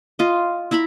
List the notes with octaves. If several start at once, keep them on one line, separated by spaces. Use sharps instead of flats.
F4 D#5
E4 E5 A#5 B5